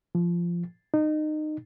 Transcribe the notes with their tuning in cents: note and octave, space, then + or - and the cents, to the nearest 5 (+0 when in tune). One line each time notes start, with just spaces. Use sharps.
F3 -15
D#4 -25